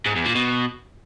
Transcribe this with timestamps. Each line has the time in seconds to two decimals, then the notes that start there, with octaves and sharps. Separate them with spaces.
0.06 G#2
0.15 E2
0.25 A#2
0.35 B2